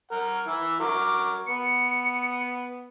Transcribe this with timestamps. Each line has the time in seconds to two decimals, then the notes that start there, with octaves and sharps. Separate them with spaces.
0.12 A#4 F#5
0.48 E3 E5
0.80 F#4 A#4 D6
1.47 B3 C#7